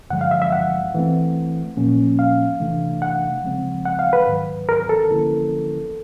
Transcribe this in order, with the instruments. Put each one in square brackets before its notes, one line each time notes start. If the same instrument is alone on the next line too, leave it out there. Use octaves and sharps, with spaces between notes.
[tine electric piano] G2 D3 F3 G#3 [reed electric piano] F#5
[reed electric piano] F5
E5
E5
F#5
[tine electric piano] E3 A3 C4
A#2 F3 A#3 C#4
[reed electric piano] F5
[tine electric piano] C3 E3 A3 D4
[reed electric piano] F#5
[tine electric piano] C#3 F3 G#3 C4
[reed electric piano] F#5
F5
B4
[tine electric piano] G#2 D#3 F#3
[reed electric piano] A#4
A4
[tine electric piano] D3 F3 A#3 C#4 E4